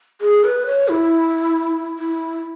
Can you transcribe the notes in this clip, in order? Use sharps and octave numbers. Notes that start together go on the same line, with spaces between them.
G#4
B4
C#5
E4
E4